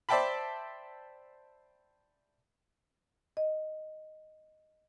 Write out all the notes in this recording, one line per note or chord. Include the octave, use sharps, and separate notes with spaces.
C5 D5 E5 G5 A5 B5
D#5